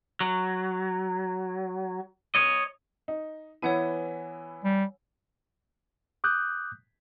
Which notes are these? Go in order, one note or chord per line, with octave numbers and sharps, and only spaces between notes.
F#3
C#5 D#5
D#4
E3 B3 E4 C#5 F#5 G#5
G3
D6 D#6 F#6 G6